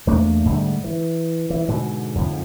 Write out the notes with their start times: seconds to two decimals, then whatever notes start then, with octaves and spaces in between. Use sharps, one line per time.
0.07 E2 A3 A#3 D4
0.46 G#2 D3 G3 A3
0.84 E3
1.50 E3
1.68 G#2 B2 D3
2.15 F2 G#2 D3 F3